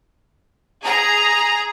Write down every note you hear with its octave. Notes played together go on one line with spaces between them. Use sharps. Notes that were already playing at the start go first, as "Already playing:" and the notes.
G#4 A#5